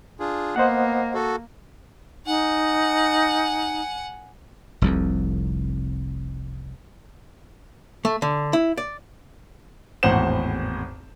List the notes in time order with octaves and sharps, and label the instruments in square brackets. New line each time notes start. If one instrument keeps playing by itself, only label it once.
[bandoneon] D4 F4 G#4
[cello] A#3 [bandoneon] B3 [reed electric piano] C5 D#5 F#5
[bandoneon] F#4 A4
[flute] D#4 [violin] F#5 G#5
[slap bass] F1 C2 F2
[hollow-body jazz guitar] A3
D3
E4
D5
[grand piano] G#1 E2 A2 C5 F#5 E7